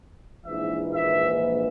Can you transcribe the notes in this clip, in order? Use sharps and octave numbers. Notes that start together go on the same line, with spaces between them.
A#1 G#2 E3 E5
E5